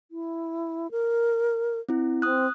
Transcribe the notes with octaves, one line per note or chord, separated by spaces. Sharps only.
E4
A#4
C4 E4
C4 D#6 F#6